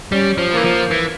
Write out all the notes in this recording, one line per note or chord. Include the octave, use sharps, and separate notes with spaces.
G3 C#4
F3
A#3
E3
F3
E3